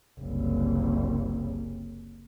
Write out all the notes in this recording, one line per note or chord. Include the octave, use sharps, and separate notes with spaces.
F#1 C2